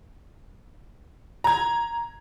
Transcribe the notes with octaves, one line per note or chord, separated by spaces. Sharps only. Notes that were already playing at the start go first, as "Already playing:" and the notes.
A#5 G#6